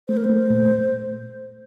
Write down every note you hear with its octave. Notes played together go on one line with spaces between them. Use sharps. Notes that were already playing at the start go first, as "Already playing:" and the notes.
A3 C5
A#4
C5
A3
A#2